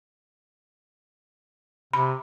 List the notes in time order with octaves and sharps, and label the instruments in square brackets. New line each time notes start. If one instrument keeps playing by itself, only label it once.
[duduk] C3 [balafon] B5